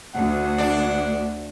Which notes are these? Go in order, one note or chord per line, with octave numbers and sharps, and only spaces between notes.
D2 F#5
D4